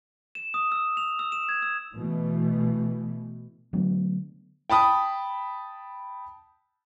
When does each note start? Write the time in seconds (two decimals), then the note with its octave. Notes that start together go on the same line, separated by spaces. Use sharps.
0.35 E7
0.54 D#6
0.72 E6
0.97 F7
1.19 E6
1.32 E7
1.49 G#6
1.62 E6
1.94 B2 E3 A3
3.73 D3 F#3 A3 B3
4.70 G5 A5 B5 D#6